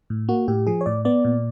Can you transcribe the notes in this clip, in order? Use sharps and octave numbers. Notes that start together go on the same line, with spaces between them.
A2
A#3 F#4
A2 G4
F3 G#4
C#5
A2 D5
B3 D5
A#2